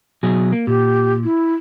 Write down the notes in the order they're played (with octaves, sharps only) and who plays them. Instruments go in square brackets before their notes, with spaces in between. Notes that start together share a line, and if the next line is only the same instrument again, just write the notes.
[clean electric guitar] B2 F#3 G#4
A#3
[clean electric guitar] A#2 [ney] G4
[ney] E4